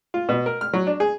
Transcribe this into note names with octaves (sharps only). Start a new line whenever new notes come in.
F4
B2
A#4
F6
F#3
D4
G#4